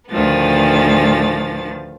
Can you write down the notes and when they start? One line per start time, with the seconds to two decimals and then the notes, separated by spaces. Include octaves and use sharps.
0.12 D2 A2 D#3 F3 B3 A6